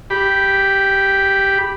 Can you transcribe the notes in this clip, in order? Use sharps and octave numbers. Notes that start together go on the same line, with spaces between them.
G4 B5